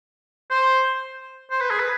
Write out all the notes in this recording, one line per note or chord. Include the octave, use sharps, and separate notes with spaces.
C5
C5
B4
G#4
B4